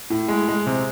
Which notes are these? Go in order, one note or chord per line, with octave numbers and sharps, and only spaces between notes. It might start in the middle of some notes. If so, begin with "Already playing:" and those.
A2
G#3
G#3
C3